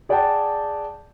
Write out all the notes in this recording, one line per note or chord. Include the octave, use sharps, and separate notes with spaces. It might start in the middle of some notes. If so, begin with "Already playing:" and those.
G#4 D5 F#5 G5 A5